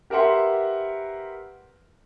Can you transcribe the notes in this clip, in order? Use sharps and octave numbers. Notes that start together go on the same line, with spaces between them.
G4 A#4 B4 E5 F#5 C6